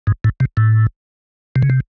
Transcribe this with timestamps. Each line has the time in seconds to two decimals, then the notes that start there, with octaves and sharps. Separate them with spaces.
0.07 G#2
0.24 A2
0.40 C3
0.57 A2
1.56 C3
1.62 C#3
1.70 C3